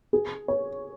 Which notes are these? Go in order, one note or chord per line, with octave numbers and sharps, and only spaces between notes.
G#4
C#5